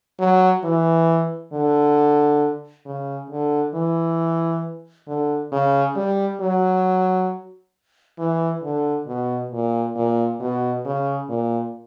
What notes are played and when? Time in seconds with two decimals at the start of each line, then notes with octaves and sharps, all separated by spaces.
0.19 F#3
0.64 E3
1.53 D3
2.86 C#3
3.30 D3
3.75 E3
5.08 D3
5.52 C#3
5.96 G3
6.41 F#3
8.19 E3
8.63 D3
9.07 B2
9.52 A#2
9.96 A#2
10.40 B2
10.85 C#3
11.29 A#2